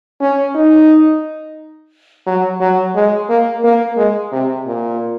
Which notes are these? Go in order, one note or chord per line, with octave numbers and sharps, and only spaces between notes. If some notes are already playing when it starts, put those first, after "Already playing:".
C#4
D#4
F#3
F#3
G#3
A#3
A#3
G#3
C3
A#2